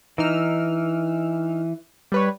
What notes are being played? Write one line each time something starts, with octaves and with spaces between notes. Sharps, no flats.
E3 D#4 E6 F6
G3 B4 C#5